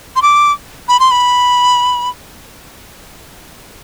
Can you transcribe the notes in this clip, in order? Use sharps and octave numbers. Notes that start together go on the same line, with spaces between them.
C6
D6
B5
C6
B5